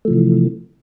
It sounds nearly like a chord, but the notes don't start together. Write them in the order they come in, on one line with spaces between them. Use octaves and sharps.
A3 F3 C3 E3